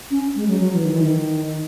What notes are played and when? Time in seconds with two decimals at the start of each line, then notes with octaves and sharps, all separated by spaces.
0.11 C#4
0.36 G#3
0.48 F#3
0.60 F#3
0.73 E3
0.85 D#3
0.93 E3
1.02 D#3